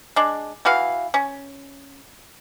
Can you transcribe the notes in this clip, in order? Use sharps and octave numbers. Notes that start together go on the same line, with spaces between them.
G#3 D4
E3 F#4 B4 F5
C#4